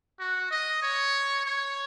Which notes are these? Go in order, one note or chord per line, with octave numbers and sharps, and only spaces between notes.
F#4
D#5
C#5
C#5